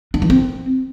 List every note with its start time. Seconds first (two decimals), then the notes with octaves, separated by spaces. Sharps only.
0.14 D4
0.22 E3
0.30 C4